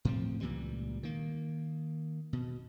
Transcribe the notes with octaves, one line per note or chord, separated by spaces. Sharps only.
A2 F3 C4
C#2 A#2 E3 G3
D#3 A#3
B2